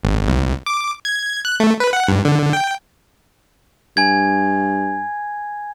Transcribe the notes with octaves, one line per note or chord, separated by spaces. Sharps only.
G#1
C2
D6
G#6
F#6
A3
B4
F#5
G2
D3
G5
G2 G#5 G#6